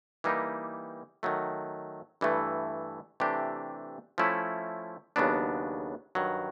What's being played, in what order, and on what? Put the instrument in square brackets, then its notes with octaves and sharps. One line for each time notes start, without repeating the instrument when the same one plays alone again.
[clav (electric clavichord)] E3 G3 A#3 D#4 G4
D#3 F#3 A3
G2 E3 A3
C3 E3 A3 D4 G4
F3 A3 C#4 E4
D#2 C#3 F#3 B3 D4
G2 D#3 F#3